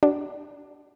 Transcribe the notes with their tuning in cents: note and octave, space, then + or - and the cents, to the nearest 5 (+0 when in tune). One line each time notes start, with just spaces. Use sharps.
D4 -10 F#4 +40 D5 +0